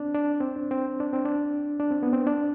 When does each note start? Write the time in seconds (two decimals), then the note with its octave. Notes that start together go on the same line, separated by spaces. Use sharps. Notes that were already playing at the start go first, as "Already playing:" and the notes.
Already playing: C4 D4
0.15 D4
0.40 C4
0.56 D4
0.71 C4
1.00 D4
1.13 C4
1.25 D4
1.80 D4
1.91 C4
2.03 B3
2.13 C4
2.27 D4